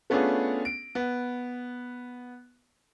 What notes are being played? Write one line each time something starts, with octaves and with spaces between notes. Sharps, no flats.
A3 B3 C#4 D4 F4 G#4
D7
B3